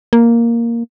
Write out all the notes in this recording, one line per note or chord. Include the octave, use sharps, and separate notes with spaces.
A#3